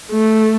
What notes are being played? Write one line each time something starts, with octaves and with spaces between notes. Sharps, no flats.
A3